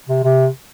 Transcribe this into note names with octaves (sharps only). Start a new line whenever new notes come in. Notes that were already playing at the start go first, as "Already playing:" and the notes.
C3
C3